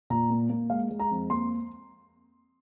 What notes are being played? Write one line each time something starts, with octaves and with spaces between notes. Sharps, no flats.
A#2 A#5
A#3
A#3
G#3 F5
G#3
A#5
F2
A#3 C6